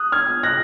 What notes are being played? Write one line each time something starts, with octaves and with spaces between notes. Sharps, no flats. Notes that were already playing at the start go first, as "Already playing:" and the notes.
Already playing: D#6 F#6
F6 G#6
F#6 A#6